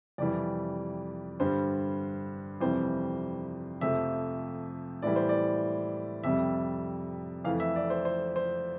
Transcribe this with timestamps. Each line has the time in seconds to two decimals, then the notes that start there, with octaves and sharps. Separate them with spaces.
0.18 F2 C3 E3 G3 D5
1.40 G2 D3 G3 C5
2.61 F2 C3 E3 G3 C5
3.81 F2 C3 F3 A3 E5
5.02 A2 E3 G3 D5
5.16 C5
5.29 D5
6.24 F2 C3 G3 E5
7.45 F2 E3 A3 F5
7.60 E5
7.76 D5
7.90 C5
8.05 C5
8.36 C5